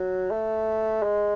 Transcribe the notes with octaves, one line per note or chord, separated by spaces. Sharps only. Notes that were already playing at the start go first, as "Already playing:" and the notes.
Already playing: F#3
A3
G#3